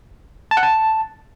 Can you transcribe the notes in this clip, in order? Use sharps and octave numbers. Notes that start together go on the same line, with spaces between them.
A5
F#5
A5